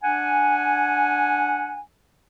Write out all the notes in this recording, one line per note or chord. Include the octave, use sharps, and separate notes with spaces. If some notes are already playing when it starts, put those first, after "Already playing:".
D4 F#5 G#5